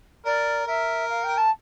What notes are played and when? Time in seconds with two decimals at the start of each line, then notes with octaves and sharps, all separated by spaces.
0.25 A#4 D5
0.67 A#4 E5
1.09 F5
1.23 G5
1.37 A5